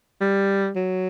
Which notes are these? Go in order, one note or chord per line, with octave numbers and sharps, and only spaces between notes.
G3
F#3